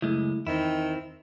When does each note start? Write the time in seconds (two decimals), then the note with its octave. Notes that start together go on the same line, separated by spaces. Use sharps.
0.02 C#2 F#2 G#3 A3 E4
0.47 E2 D#3 C4 E4